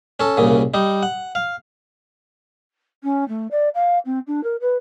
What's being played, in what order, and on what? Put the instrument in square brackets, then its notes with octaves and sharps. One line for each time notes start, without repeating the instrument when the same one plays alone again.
[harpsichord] C#4 A4
C2 A#2 C#3
G3 D#4
F#5
F5
[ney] C#4
A3
D5
F5
C4
D4
A#4
B4